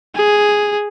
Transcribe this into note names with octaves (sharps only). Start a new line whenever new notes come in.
G#4